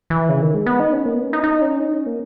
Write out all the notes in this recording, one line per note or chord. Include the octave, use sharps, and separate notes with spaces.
E3
C#3
D#3
G#3
B3
D#4
C#4
A#3
B3
C#4
D#4
D#4
C#4
D#4
C#4
A#3